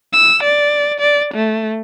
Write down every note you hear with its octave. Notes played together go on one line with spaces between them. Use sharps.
E6
D5
D5
A3